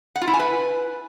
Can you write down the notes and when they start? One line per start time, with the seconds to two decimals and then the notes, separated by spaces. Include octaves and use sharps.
0.16 F#5
0.22 F4
0.28 E4
0.34 G#5
0.39 B4